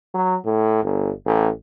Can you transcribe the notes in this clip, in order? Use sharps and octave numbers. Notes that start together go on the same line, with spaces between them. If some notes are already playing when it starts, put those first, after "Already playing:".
F#3
A2
G1
A1